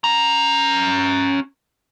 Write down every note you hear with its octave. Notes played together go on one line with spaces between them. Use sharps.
C#4 A#5